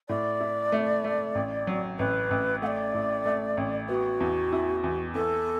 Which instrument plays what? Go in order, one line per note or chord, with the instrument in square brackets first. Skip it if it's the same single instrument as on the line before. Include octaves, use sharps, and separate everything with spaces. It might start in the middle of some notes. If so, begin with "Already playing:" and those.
[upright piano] A2 [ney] D5
[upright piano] E4
A3
A3
A1
F#3
[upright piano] A1 [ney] B4
[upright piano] A1
[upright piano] A3 [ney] F#5
[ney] D5
[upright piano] A2
A3
A1
[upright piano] B3 [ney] F#4
[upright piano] E2
E4
E2
[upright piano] E2 [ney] A4